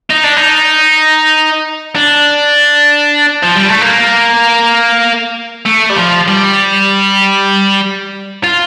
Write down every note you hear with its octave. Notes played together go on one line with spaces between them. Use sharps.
D#4
D4
D#4
D4
F3
G3
A3
A#3
A3
G3
F3
G3
F4